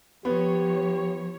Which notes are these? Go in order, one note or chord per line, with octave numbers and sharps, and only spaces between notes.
F3 B3 G4 C#5